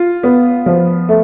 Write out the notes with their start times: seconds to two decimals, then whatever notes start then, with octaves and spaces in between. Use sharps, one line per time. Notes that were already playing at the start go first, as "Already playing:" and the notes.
Already playing: F4
0.23 B3
0.66 F3
1.09 A3